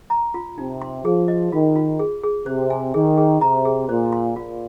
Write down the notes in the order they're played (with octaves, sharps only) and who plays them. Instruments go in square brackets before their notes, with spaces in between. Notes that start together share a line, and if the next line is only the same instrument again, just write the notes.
[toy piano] A#5
F4
[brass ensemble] C3 [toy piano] D#4
[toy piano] C6
[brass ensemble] F3 [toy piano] G#4
[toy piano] D#5
[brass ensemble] D#3 [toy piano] F4
[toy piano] F4
G#4
G#4
[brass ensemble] C3 [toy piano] C5
[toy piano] G#5
[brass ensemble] D#3 [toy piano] G#4
[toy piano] G#4
[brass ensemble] C3 [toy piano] A#5
[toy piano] G#4
[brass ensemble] A#2 [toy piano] C5
[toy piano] C6
[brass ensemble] A#2 [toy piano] F4